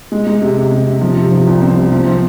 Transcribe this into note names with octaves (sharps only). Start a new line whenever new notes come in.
G#3
G#3
C3
C3
C3
C3
F3
C3
F3
C2
C4
C3
F3
C4